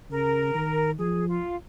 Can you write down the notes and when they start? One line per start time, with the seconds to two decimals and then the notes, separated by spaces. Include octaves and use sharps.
0.11 C#3 A#4
0.55 D#3
0.99 F3 G#4
1.29 F4